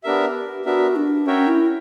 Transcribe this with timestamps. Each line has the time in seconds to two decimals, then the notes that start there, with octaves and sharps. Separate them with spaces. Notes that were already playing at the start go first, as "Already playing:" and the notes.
0.03 B3 D4 G4 A#4 E5
0.65 B3 D4 F#4 A#4 E5
0.96 D4
1.26 C#4 F#4 A#4 C#5 E5 G5
1.47 E4